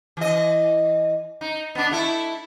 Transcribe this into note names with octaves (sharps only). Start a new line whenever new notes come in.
E3 D#5
D#4
B3 D4
A3 E4